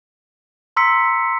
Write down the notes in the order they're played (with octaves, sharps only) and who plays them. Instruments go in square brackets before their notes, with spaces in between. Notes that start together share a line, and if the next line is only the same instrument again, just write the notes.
[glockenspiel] A#5 C6 E6 B6 C#7